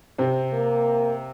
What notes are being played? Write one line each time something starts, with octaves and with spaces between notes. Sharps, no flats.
C3 C4
A#3